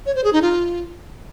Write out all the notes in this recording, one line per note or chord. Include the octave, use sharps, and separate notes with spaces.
C#5
C5
G#4
D#4
F4